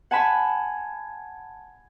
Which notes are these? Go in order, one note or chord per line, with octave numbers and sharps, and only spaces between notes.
F#5 G#5 A5 B5